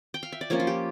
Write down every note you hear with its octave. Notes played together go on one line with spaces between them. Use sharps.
G5
F5
E5
D5
F3 A#3 C#4 C#5
F4
G4